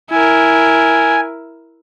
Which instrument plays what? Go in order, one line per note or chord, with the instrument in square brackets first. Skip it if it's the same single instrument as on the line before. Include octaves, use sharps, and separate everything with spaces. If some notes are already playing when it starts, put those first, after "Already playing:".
[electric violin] E4 A#4 [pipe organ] G#5